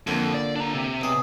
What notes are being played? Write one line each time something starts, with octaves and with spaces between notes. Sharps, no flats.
F2 D3 A#3 F4
D5
D4 A#5
C3
B1 G#4